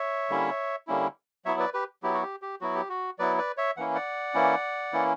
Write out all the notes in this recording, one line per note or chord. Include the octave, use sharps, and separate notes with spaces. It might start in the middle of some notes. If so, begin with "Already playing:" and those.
Already playing: C#5 E5
D3 G3 A#3 C#4 E4
D3 G3 A#3 C#4 E4
F#3 B3 E4 C#5 E5
B4 D5
G4 B4
F#3 B3 E4 G4
F#4
G4
G4
F#3 B3 E4 F#4
G4
F#4
F#3 B3 E4 B4 D5
B4 D5
C#5 E5
E3 A#3 C#4 E4 F#5
D5 F#5
E3 A#3 C#4 E4
E3 A#3 C#4 E4